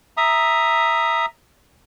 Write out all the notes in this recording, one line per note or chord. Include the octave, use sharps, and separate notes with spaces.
E5 A#5 D#6